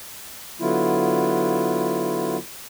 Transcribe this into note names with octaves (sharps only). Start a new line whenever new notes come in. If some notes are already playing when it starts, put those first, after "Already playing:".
D3 F#3 B3 E4 F4